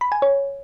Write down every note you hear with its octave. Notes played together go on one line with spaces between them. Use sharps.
B5
G#5
C#5